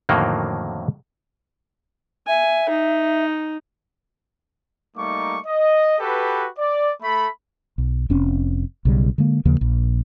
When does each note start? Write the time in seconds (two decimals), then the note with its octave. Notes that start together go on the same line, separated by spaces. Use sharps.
0.09 F2 A2 D3 D#3 F#3 A#3
2.28 E5 G#5
2.69 D#4
4.97 G3 A3 A#3 D#4 C#6 D6
5.46 D#5
5.99 F#4 G4 A4 B4
6.59 D5
7.02 A3 B5
7.78 B1
8.10 F1 C4 C#4
8.85 B1 C#3 G3
9.18 D3 G#3 A#3
9.45 D#2 C#3 F3 A#3
9.61 A#1